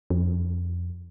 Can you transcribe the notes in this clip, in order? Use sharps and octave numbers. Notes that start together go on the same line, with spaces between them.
F2